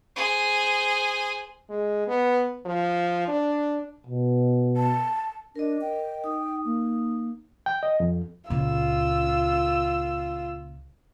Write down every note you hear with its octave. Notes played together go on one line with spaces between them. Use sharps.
G#4 C5
G#3
B3
F3
D4
B2
A5
D4 A#4 D#5
G5
D#4 D#6
A#3
G5
D#5
F2
C#2 A#2 F4 E6